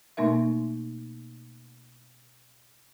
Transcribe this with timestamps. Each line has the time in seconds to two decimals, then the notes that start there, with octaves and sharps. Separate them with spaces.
0.17 B2 A3 A#3 D#4 A#4 E5